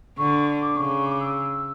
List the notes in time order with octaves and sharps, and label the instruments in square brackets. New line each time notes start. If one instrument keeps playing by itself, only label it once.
[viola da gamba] D3 [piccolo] C#6
[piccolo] D6
[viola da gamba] C#3 [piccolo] C#6
[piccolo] D6
E6